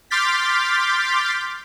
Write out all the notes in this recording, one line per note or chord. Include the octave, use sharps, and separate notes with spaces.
C6 D6 F6 G6 A6 B6